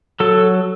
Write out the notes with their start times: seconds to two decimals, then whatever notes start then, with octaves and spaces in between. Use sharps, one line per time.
0.20 F#3 A4